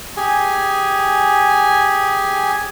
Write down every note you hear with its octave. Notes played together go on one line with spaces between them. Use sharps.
G4 G#4 G#5